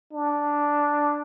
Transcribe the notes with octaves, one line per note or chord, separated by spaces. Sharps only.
D4